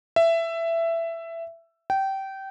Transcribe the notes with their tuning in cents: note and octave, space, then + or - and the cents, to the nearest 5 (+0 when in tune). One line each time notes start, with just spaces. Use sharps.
E5 +15
G5 -20